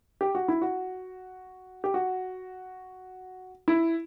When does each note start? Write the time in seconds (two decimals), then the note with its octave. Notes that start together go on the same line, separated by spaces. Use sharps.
0.21 G4
0.35 F#4
0.48 E4
0.62 F#4
1.84 G4
1.94 F#4
3.68 E4